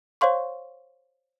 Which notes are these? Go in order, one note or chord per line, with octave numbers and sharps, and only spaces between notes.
C5 C#5 F5 C6 C#6